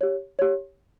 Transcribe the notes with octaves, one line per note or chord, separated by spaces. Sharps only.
G4 C#5
G4 C#5